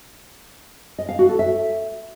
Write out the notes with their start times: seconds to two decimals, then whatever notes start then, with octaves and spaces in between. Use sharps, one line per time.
0.99 D#5
1.09 F5
1.19 F#4
1.29 A4
1.39 E5